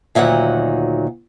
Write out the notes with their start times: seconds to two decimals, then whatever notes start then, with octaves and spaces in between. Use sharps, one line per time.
0.15 D2 A#2 D#3 F#3 F#5